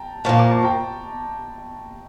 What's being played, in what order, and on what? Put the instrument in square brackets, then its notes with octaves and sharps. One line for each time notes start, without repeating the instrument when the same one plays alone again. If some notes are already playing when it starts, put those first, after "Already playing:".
Already playing: [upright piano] G5 A5 A#5
[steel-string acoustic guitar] A#2 F3 A#3 [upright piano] A5 C#6
[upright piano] A#5 D6
A5 C#6
G5 A#5